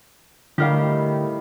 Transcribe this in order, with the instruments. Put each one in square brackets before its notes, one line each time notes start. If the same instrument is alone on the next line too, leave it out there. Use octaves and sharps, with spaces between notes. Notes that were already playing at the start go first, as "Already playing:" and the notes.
[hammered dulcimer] A2 D#3 G3 [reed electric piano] D3 [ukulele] G4 A#4 F5